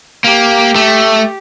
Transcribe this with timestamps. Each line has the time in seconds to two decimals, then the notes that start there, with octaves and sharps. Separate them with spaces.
0.24 A#3 G4
0.75 A3